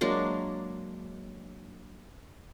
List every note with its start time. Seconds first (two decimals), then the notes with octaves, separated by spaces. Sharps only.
0.01 F#3 G#3 A#3 D4